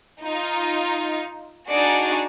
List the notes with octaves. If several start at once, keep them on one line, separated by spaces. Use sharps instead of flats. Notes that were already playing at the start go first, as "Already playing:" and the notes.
D#4 F4
D4 D#4 F#4 G#4 D5